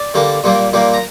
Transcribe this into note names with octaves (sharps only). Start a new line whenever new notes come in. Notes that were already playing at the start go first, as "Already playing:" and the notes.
Already playing: D5
D3 G3 A#3
A#2 G3 A#3
A#2 G3 A#3
A#5